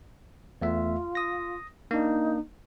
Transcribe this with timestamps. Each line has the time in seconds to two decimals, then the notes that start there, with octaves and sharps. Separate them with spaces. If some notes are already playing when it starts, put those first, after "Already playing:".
0.62 E2 A3 F4 E5
1.15 D#6 A#6
1.91 A#3 D4 D#4